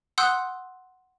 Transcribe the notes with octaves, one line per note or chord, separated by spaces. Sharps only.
F#5 C6 D#6 E6 F#6 G6